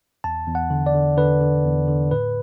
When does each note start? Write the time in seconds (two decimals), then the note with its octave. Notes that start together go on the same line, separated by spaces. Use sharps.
0.24 E2 A5
0.47 E2
0.55 F#5
0.70 D3
0.86 D5
0.94 D3
1.17 D3 B4
1.41 D3
1.65 E2
1.88 D3
2.11 A2 B4